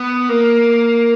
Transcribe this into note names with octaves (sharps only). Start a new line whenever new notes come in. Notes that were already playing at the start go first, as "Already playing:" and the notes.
Already playing: B3
A#3